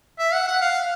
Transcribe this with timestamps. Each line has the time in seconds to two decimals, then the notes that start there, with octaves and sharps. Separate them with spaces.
0.19 E5
0.33 F#5
0.48 F#5
0.61 F5